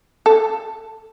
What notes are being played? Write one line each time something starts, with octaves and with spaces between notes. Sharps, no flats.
A4